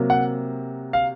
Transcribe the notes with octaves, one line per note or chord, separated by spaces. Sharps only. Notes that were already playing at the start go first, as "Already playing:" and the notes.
Already playing: C3 F#3 A#3
F#5
F5